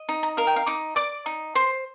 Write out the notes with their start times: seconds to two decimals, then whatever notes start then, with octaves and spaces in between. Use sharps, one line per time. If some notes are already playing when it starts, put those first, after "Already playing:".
Already playing: D#5
0.09 D#4
0.23 A#5
0.37 A#4 F5
0.47 G5
0.56 F5
0.66 D#4 D6
0.96 D5 D6
1.26 D#4
1.55 C5 C6